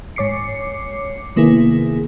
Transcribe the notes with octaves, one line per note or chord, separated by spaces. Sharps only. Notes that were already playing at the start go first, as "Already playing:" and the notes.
G#2 C#5 D6 C7 C#7
C3 D#3 A#3 B3 E4 G#4